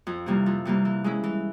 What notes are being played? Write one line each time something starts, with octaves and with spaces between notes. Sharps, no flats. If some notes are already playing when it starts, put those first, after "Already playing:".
F2
C3 E3 G3 A#3
F2
C3 E3 G3 A#3
E3
G#3 C#4 E4
E3